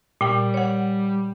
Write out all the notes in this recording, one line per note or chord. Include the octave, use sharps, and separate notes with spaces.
A#2 G3 G5
C#5 F#5